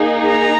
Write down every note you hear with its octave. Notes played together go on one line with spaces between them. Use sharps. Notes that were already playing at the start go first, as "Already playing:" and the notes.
Already playing: A#3 D#4 G#4
A#5